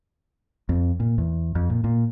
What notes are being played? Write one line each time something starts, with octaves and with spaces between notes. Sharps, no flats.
F2
A#2
E2
F2
A#2
A#2